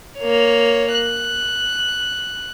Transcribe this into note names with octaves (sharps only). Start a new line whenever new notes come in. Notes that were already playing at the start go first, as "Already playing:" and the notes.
A#3 C#5
F#6